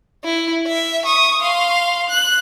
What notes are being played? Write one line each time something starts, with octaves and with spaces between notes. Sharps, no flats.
E4
E5
C#6 D#6
F5 C6
F#6